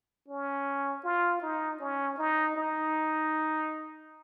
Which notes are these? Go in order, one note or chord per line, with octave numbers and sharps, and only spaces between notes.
C#4
F4
D#4
C#4
D#4
D#4